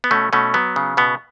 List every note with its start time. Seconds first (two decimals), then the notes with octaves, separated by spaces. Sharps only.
0.04 B3
0.11 B2 A3 C#4
0.33 B2 A3 C#4
0.54 F#3 B3
0.76 C#3
0.97 B2 B3